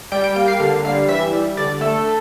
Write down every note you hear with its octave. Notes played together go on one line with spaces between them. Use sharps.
G3 G5
G5
A#3 G5
F5
D3 F5
G3 F5
E3 E5
G3
D3 D5
A3 A4